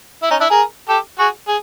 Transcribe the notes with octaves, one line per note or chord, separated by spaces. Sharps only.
E4
C#4 D#4
D4 E4
G#4 A#4
G4 A4
F#4 G#4
G#4